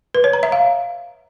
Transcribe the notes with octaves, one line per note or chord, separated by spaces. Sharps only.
B4
C#5
A#5
E5
F5